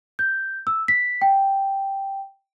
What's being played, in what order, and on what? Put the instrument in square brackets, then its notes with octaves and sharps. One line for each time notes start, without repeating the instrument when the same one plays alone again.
[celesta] G6
E6
B6
G5